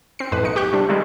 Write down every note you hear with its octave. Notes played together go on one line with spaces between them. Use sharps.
C4 C7
F2 A2 B4
B1 D#4 C#7
G4 C#6 F#6
C3 G3 D4
C3 D#3 G3 G#3